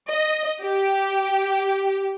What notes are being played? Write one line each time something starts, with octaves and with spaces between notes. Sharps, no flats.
D#5
G4